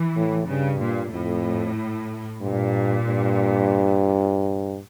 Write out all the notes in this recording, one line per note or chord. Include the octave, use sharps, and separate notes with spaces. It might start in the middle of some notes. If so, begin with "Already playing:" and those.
Already playing: E3
A2
G2 C#3
A#2
F2 A2
G2 A#2
G2